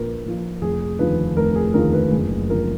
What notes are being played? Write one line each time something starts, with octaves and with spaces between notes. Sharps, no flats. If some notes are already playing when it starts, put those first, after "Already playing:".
Already playing: A#1 A#2 F3 A#4 B4
A#2 F3
F1 G#4
D#2 D3 F3 B4
F1 A#4
G#4
D#2 D3 F3 A#4
B4
F#1 G#4
F2 D3 F3 A#4